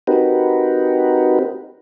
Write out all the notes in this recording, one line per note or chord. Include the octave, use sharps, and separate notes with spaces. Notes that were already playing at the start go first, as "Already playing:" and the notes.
C4 D#4 F#4 G4 A#4 B4